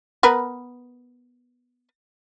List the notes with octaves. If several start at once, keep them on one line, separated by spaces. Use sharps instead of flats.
B3 A#4 B4